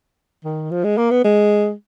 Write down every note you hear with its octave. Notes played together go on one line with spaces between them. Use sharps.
D#3
F3
G#3
A#3
B3
G#3